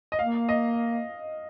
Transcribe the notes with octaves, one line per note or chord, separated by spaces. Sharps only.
D#5
A#3 F5
D#5